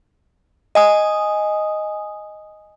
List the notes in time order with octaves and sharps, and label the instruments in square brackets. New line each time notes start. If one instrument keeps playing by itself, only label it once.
[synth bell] D#5 G#5 D#6